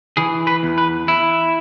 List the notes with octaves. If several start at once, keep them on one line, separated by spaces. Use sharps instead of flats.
E3 G#4
B4
E2
B4
E4